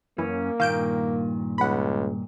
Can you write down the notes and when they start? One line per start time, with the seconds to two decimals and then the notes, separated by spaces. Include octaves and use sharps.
0.18 F#2 E3 A#3 C#4
0.60 G2 A#2 D#3 F5 G6 D7
1.58 C#2 F#5 B5